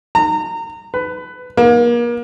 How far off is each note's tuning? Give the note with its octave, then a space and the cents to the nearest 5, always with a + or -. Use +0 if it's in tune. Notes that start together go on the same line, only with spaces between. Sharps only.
A#5 -25
B4 +15
A#3 +35